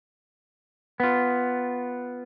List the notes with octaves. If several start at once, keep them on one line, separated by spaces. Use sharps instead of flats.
B3 F4